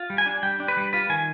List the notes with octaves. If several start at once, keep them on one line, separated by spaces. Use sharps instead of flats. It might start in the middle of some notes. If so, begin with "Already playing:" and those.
Already playing: F4
G3
G#5
D4
G3 G5
D4
B4
G3
F4 B4
D#3 G#5